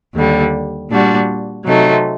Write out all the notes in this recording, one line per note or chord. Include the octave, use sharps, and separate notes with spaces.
D#2 D3 G3
A#2 G3 D4 F#4
C3 F#3 A3 D#4